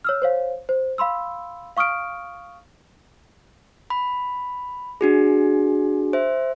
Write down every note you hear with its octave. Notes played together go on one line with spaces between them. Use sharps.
C#5 E6 F6
C5 C#5 F5
C5
F5 B5 C6 E6
F5 C#6 D#6 F6 D7
B5
D4 F#4 G#4
C5 E5